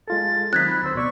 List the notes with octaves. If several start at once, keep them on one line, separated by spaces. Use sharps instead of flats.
G#3 F4 A4 A6
D#3 F#3 C4 D#4 F#6 G#6 B6
B5
D2 C5 E6
B2 D5 C#6